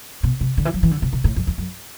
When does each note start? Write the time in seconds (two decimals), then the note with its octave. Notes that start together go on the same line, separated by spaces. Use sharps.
0.23 B2
0.41 C3
0.57 D3
0.65 E3
0.74 F#3
0.83 E3
0.91 D3
1.02 C3
1.13 B2
1.24 A2
1.36 F#2
1.47 E2
1.58 F#2